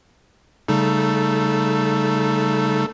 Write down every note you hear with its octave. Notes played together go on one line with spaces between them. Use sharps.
C#3 G3 A3 D#4